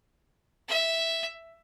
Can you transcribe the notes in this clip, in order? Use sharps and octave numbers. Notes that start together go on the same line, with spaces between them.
E5